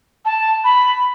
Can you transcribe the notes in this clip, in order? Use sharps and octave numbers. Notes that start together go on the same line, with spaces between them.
A5
B5